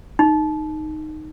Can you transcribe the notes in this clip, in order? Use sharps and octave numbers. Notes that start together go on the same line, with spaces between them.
D#4